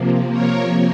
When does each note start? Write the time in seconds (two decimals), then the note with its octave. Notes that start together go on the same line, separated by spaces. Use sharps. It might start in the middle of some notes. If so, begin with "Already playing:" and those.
Already playing: C3 F3 A#3
0.30 A#4 C#5